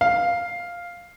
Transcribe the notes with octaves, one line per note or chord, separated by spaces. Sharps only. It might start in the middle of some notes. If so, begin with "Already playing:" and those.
F5